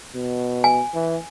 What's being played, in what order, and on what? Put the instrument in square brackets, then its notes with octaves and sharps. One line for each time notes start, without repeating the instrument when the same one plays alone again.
[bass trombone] B2
[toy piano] G#5
[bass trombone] E3